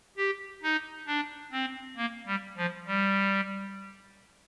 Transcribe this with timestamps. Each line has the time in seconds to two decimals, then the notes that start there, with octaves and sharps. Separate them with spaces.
0.17 G4
0.63 D#4
1.07 D4
1.52 C4
1.97 A#3
2.27 G3
2.57 F3
2.87 G3